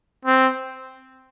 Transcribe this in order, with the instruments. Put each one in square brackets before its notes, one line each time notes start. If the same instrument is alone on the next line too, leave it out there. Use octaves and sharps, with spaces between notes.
[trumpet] C4